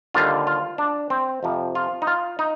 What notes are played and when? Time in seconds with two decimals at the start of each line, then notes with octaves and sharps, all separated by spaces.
0.14 D#2 D3 G3 F4
0.47 F4
0.78 D4
1.10 C4
1.43 F2 C3 F3
1.75 F4
2.02 D#4
2.07 F4
2.39 D#4